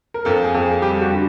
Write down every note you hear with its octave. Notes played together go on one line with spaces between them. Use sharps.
A#4
F2 A4
G#4
F2
G#4
G3 G4
F#4
D3